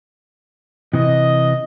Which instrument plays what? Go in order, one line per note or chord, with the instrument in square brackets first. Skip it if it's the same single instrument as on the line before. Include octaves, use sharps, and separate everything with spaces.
[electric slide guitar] C3 E3 [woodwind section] D#5